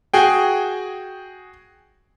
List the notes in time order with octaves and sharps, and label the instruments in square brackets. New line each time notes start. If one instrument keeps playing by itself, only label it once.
[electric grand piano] F#4 G#4 G5